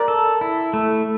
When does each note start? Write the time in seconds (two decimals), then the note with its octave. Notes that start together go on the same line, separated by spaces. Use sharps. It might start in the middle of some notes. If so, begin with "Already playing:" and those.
Already playing: A#4 D5
0.08 A4
0.41 E4
0.73 A3